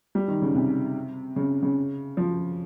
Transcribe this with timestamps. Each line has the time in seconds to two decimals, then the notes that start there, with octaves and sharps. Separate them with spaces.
0.15 G3
0.28 D#3
0.42 C#3
0.55 C3
1.36 C#3
1.63 C#3
2.17 F3